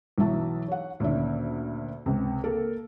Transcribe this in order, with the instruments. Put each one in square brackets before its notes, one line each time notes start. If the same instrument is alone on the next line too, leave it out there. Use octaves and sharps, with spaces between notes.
[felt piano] B1 E3 F#3 E5 A5
C#5 F#5
D2 A#2 D#3 C#4 E5
C#2 C3
A#3 A4 A#4